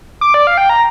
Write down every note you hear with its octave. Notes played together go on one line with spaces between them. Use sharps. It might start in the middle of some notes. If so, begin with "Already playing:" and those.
D6
D5
F5
G5
A#5